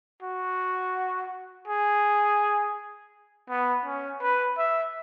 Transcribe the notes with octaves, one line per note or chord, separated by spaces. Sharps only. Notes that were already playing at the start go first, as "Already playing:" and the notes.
F#4
G#4
B3
C#4
B4
E5